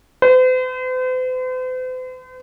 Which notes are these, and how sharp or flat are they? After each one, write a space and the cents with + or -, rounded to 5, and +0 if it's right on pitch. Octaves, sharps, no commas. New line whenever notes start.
C5 -45